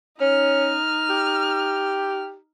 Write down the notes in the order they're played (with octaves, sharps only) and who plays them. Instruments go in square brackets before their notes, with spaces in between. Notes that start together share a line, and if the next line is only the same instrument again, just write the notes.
[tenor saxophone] C#4 [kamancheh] D#4 F6
[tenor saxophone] G4